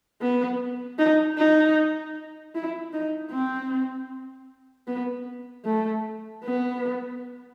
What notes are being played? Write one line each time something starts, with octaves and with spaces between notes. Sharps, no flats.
B3
D#4
D#4
E4
D#4
C4
B3
A3
B3